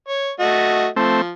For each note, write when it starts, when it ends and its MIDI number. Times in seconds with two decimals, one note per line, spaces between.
0.08 0.30 73
0.40 0.87 57
0.40 0.87 66
0.40 0.87 75
0.96 1.32 53
0.96 1.22 57
0.96 1.22 60